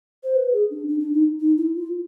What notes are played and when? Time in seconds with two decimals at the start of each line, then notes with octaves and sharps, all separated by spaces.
0.24 C5
0.36 B4
0.53 G#4
0.71 D4
0.88 D4
1.00 D4
1.14 D#4
1.40 D#4
1.57 E4
1.76 F4